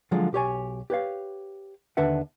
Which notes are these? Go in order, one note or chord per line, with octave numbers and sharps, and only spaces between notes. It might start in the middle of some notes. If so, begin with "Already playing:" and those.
D3 F3 F#3 G#3 F4 G#4
B1 G4 C#5 G#5
G4 B4 C#5 F5
D#2 D3 D4 B4 E5 F#5